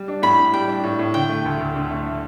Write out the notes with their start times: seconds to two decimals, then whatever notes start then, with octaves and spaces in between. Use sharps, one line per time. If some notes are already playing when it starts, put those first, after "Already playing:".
Already playing: G3
0.08 D4
0.22 A2 B5
0.38 A2
0.53 G3 G5
0.68 D4
0.84 A2
0.99 A2
1.14 D3 G5
1.29 A3
1.45 D2
1.60 D2
1.75 D3
1.91 A3